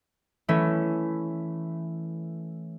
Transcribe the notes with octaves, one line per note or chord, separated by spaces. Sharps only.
E3 A3 C#4